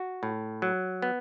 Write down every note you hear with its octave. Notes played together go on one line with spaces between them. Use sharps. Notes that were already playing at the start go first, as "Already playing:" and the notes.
Already playing: F#4
A2
F#3
B3